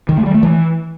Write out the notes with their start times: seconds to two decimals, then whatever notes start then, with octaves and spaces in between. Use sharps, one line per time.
0.09 D#3
0.17 A3
0.26 G3
0.34 A3
0.43 E3